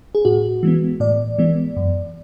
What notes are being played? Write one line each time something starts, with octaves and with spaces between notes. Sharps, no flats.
G#4
A2 F#4
E3 G#3 B3
A2 D5
E3 G#3 B3
F#2